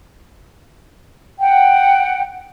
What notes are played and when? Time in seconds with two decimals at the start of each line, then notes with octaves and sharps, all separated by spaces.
1.39 F#5 G5